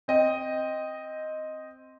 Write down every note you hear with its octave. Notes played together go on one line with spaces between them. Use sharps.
C4 D#5 G5